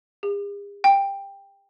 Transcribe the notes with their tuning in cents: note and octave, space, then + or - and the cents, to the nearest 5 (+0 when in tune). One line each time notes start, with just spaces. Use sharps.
G#4 -45
G5 +10